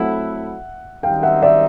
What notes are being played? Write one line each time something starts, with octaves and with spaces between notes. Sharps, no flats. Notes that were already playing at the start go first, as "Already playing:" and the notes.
Already playing: F#3 A3 C4 E4 A4 E5 F#5
F#2 D#3 G3 C4 D#4 F5 G5
E5 F#5
D5 E5